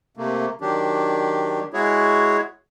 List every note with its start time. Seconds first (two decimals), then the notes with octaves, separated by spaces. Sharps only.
0.17 C3 A3 A#3
0.61 D#3 F#3 D4 G4
1.74 G#3 E4 F#4 G#4 C#5